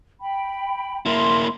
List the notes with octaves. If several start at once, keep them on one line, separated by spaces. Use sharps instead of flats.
G5 B5
A#3 E4 E5 B5 C6